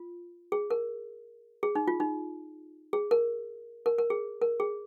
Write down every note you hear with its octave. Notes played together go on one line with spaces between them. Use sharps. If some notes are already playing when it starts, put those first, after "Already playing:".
Already playing: F4
G#4
A#4
G#4
D#4
F4
D#4
G#4
A#4
A#4
A#4
G#4
A#4
G#4